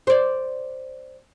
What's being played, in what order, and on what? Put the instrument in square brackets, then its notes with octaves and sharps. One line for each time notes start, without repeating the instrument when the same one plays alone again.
[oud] C5 D5